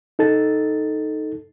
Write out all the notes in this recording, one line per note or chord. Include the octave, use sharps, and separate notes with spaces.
D#4 A4 A6